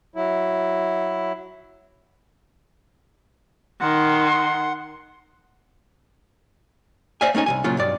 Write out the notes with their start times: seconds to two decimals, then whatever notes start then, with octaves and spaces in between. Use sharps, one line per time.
0.15 F#3 E4
3.81 D#3 F#5 C6
7.21 C5 D5 E5 F5 G#5
7.35 A3 C#4 D#4 G#5
7.46 C2 E3 G#5
7.64 A#2 C#3 F#3 F4
7.77 B1 G2 D5